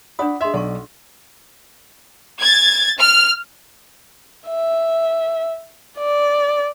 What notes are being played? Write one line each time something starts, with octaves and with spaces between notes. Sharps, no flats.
D4 F4 D5 F#5 B5 D#6
G#4 D#5 E5 C6
B1 D5 F#5 A5 C#6
G#6 A6
F6
E5
D5